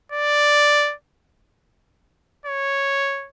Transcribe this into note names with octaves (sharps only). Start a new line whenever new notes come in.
D5
C#5